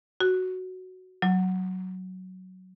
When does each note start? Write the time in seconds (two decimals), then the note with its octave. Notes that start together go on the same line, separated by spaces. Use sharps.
0.20 F#4
1.22 F#3